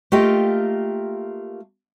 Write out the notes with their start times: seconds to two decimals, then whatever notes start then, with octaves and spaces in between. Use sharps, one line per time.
0.12 A3 A#3 F4 G4 D#5 G5